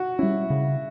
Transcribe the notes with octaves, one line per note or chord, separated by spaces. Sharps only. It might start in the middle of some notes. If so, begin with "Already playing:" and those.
Already playing: F#4
G3 C#4 E4
C#3